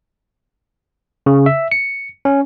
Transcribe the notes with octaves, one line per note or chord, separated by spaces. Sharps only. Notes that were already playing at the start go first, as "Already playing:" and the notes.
C#3
E5
C#7
C#4